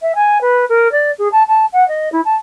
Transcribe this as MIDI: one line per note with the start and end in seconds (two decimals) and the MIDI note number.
0.02 0.12 76
0.15 0.38 80
0.41 0.65 71
0.69 0.91 70
0.92 1.11 74
1.18 1.28 68
1.32 1.43 81
1.48 1.66 81
1.73 1.87 78
1.88 2.09 75
2.12 2.21 64
2.25 2.35 81